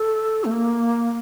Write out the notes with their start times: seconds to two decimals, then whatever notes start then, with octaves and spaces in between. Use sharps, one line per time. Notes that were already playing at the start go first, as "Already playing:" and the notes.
Already playing: A4
0.45 A3
0.52 A#3